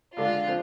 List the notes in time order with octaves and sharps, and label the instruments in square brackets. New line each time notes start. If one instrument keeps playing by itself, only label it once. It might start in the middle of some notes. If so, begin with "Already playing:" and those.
[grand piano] D3 G#3 D4 [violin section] F4
[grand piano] F3 C4